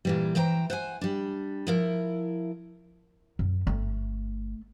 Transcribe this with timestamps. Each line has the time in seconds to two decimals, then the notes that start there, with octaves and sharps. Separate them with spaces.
0.05 A#2 E3 G3
0.35 E3 C5 G5 A#5
0.70 C5 F#5 G#5
1.01 G3 D4
1.67 F3 E4 A#4
3.39 F#2
3.67 G1 A3